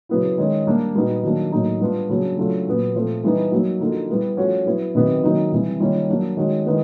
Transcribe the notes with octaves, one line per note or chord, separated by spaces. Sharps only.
C#3 F#3 B3 E4
D#3 G#3 C#4
G3 A#3 D4
A#2 G3 B3 D#4 F#4
D#3 F#3 A#3 D4
A2 F#3 A#3 D#4
G3 B3 D4 F4
C#3 F#3 A#3 D4
C#3 F#3 A3 D4 F4
A#2 F#3 B3
A#2 F3 A3 C4 F4
E3 G3 B3 D#4
F#3 A#3 D#4
D3 F3 A#3 D#4 F#4
G3 B3 E4
F3 A3 C#4 F#4
F#3 B3 E4
C3 D#3 F#3 B3
D#3 F#3 A#3 D#4
C3 E3 G3
D#3 G3 A#3 C#4 F4
F#3 A#3 D4 F#4
D#3 G#3 C#4 F#4
D#3 G#3 B3 E4